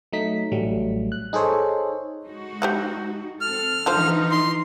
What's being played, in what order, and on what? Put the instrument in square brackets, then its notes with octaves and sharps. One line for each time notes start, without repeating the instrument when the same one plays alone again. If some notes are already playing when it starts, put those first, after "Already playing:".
[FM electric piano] F#3 A3 D#4 B6
A1 F#3 G3 A3
F#6
D#4 G#4 A4 C5 C#5
[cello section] G#3 D#4 F#4
[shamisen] G4 C5 F#5
[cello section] C4 A4 [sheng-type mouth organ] F6
[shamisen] D3 F3 C5 [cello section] E3 D#4
[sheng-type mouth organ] C6